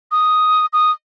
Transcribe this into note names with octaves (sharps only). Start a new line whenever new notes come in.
D#6
D#6